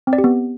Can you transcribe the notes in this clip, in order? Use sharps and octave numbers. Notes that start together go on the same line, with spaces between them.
C4
D5
G4
B3